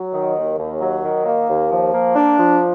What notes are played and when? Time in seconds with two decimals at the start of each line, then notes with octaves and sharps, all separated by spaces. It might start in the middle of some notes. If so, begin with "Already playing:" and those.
Already playing: F#3
0.13 D#3
0.36 D#2
0.58 D#2
0.81 F#3
1.04 D#3
1.26 A#3
1.48 D#2
1.71 F3
1.94 A#3
2.16 D4
2.38 F3